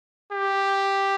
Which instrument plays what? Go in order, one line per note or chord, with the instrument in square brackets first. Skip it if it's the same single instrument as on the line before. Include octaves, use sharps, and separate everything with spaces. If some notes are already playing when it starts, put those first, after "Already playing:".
[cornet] G4